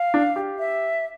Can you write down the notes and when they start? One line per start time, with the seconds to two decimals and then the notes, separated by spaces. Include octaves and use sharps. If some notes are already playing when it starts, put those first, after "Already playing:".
Already playing: F5
0.14 D4
0.36 G4
0.59 E5